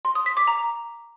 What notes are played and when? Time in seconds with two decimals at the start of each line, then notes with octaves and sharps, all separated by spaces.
0.05 C6
0.15 D#6
0.26 B6
0.37 D6
0.47 A#5